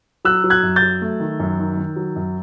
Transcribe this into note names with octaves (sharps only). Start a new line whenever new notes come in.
F#3 E6 F#6
F#3
F#6 G#6
F#2
G6 A6
F#3
A3
D#3
F#2
D#3
D#3
F#3
F#2